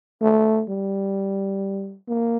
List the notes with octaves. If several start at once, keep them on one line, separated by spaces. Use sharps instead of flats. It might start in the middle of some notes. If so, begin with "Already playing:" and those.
A3
G3
A#3